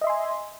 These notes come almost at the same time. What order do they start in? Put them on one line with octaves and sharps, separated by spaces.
D#5 E5 C6 G#5